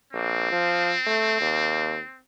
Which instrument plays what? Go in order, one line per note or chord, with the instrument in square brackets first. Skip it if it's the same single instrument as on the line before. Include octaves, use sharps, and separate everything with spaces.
[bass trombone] A#1 [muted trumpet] C4
[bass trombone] F3
A3
D#2